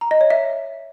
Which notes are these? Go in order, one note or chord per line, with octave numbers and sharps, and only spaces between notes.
A#5
D#5
C#5
E5